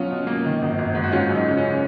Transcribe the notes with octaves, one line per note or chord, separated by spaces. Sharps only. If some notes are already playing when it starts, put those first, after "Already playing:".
Already playing: B2 F#3 C#4 F4
B2
A#3
D#3
G#1
G#1
G#2
F#4
G#3 C#4 F4
F#2
D#4
C#3
C#4